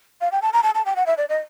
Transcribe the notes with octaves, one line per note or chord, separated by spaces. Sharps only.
F5
G5
A5
A#5
A5
A5
G5
F#5
E5
D5
D#5